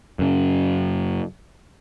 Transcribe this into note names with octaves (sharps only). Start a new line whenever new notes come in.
F#2 C#3